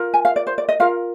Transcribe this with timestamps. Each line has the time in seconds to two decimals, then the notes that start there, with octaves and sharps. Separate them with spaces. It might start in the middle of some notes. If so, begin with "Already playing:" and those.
Already playing: F4 A#4
0.14 G#5
0.25 F5
0.36 D5
0.47 C5
0.58 D5
0.69 D#5
0.80 F4 A#4 F5